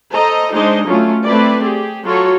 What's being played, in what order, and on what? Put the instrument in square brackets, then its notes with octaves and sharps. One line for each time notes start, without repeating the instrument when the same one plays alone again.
[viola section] A4 C5 D#5 A#5
G#3 D4 D#4 C5 D#5
F#3 A3 C#4 F4
A3 C4 E4 B4 D5
G4 G#4
F#3 F4 F#4 A4 C#5